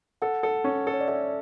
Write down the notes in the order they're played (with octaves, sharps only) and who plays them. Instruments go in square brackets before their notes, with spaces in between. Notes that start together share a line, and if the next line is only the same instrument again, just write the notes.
[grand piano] A4 [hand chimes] F#5
[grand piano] A4
C#4
A4
[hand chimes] C#5
D5
[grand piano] A4 [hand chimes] E5